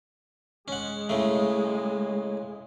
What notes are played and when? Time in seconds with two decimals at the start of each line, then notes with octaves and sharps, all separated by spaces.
0.68 G#3 C#4 F#5
1.09 A2 C#3 A3